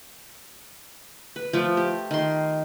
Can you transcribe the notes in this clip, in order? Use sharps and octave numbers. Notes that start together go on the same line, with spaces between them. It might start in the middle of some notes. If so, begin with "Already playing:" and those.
B4
F3 A3 E5
G4
D#3 C6